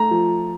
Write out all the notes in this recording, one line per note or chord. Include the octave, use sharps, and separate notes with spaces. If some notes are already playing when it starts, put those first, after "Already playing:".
Already playing: A3 A#5
F3